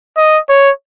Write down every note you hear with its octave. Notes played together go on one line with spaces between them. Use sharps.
D#5
C#5